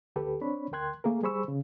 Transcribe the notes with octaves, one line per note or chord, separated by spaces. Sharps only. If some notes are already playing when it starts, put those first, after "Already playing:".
D2 G4 A4 B4
C4 D4 C#5 B5
D2 A#4 G5 C6 F#6 G#6
A3 A#3 G#4 A#4
G3 G#4 C5 B5 C#6 E6
C#3